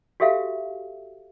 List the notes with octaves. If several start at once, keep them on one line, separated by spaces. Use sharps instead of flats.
F#4 G4 A4 E5 F5